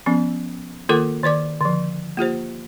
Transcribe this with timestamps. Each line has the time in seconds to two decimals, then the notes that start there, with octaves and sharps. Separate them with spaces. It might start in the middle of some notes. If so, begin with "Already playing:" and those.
0.06 F3 B3 C#4
0.89 D#3 A#3 F4 A4 A#4 D6
1.23 D#3 B4 D5 D6
1.61 D3 F3
2.17 A#3 F4 G4 C5